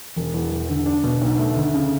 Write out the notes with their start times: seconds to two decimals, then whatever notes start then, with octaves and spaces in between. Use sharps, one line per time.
0.16 E1
0.34 E2
0.52 E1
0.70 D3
0.86 D4
1.04 B2
1.21 B1
1.38 A3
1.56 D2
1.74 C#3